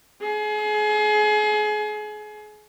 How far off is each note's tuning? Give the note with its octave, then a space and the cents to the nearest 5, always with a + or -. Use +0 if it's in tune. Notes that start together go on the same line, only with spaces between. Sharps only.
G#4 +30